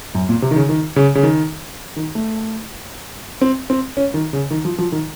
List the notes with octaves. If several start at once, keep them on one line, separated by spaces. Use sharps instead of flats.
F#2
A#2
C3
D#3
C#3
D#3
C#3
C#3
D#3
D#3
A3
C4
C4
C#4
D#3
C#3
D#3
F3
F3
D#3